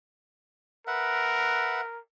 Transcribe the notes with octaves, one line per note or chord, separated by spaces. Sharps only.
A#4 B4 E5 F#5